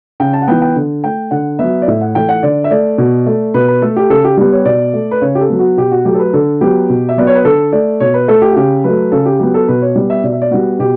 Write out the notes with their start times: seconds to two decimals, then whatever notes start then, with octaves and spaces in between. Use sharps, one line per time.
0.20 C#3 G5
0.33 A5
0.42 F#5
0.48 E3 B3 G5
0.62 G5
0.76 D3
1.04 A3 G5
1.31 D3 F#5
1.59 F#3 B3 E5
1.82 D5
1.87 A2 E5
2.01 F#5
2.15 E3 A3 G5
2.29 F#5
2.43 D3 D5
2.64 E5
2.71 A3 D5
2.98 B2
3.27 A3
3.54 B2 B4
3.68 B4
3.82 A3 A4
3.96 G4
4.10 C#3 A4
4.24 G4
4.37 G3 B3 G4
4.52 C#5
4.65 B2 D5
4.94 A3
5.11 B4
5.21 C#3 C#5
5.35 G4
5.41 A4
5.50 F#3 B3
5.59 F#4
5.77 B2 G4
5.91 F#4
6.05 F#3 A3 G4
6.14 A4
6.19 B4
6.33 D3 A4
6.61 F#3 B3 G4
6.89 B2
7.09 E5
7.17 F#3 B3 D5
7.27 C#5
7.36 B4
7.45 D3 A4
7.72 A3 D5
8.00 B2 C#5
8.14 B4
8.28 A3 A4
8.42 G4
8.52 F#4
8.56 C#3 G4
8.84 F#3 A3 B4
9.12 C#3 A4
9.26 G4
9.39 F#3 B3 G4
9.54 A4
9.68 B2 B4
9.82 C#5
9.96 G3 B3
10.10 E5
10.24 B2 D5
10.32 E5
10.42 D5
10.51 G3 B3 F#4
10.79 B2 G4